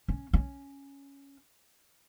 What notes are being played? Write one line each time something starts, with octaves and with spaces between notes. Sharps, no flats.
C#4
C#4